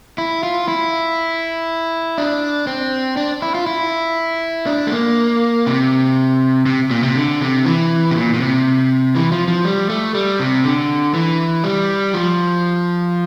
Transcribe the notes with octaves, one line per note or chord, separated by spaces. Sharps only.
E4
F4
E4
D4
C4
D4
E4
F4
E4
D4
A3
A#3
C3
C3
A#2
C3
D3
C3
E3
C3
A#2
A#2
C3
E3
F3
F3
G3
A3
G3
C3
D3
E3
G3
F3